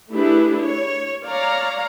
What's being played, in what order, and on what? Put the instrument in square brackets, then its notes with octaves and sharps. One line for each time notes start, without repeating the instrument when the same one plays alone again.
[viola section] A3 D4 E4 G4 G#4 B4
C#5
C#5 D5 F5 A#5